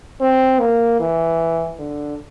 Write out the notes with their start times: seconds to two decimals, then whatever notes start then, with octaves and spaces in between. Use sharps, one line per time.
0.21 C4
0.60 A#3
1.00 E3
1.79 D3